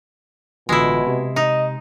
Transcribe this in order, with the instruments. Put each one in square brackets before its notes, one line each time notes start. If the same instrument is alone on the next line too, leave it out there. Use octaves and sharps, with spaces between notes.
[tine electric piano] A1 D3 F4 [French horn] B2 [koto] G#3 E4
[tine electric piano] C3
[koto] D#4 [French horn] D#5